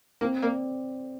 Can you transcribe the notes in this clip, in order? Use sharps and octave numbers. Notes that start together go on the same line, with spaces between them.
A#3 C4
A#3 D5